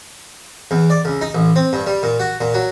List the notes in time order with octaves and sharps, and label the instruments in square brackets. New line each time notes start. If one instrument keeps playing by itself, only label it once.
[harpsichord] E2
D5
C#2
D#4
A1
C4
G2
G3
A#2
F#4
A#2
F#3